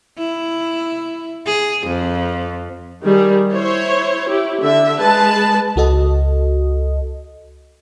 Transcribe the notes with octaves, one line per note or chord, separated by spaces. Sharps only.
E4
G#4
F2
D#3 G3 G#4
E4 C5 C#5
E4 G4
D3 E5
G#3 G#4 B4 A5
C#2 F#4 A4 D#5